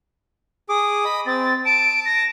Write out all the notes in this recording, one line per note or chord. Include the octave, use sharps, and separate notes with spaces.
G#4 D6 D#6
D#5 B5
C4 A6
A5 D7
A#6